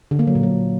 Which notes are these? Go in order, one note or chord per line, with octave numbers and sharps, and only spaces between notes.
D3
A#3
F#3
A#2
F#3